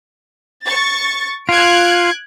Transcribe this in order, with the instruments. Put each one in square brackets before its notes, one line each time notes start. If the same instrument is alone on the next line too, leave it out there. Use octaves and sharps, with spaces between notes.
[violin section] C#6 A6
[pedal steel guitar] F4 [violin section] F#6 G#6 D7